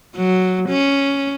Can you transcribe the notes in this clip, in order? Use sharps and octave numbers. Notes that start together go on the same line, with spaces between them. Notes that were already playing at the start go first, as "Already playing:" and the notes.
F#3
C#4